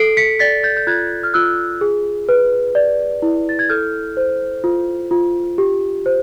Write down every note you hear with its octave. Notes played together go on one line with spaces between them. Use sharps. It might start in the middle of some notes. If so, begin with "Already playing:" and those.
Already playing: A4 C7 D7
B6 C#7
D5 A6 B6
G6 A6
G6
F4 F#6 G#6
F6
F4 E6 F#6
G#4
B4
D5
E4
A6
G#6
A4 F6 G6
C5
F4
F4
G4
C5